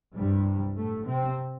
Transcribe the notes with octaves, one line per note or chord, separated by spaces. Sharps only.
C2 G2 C3 G3
A2 A3
C3 C4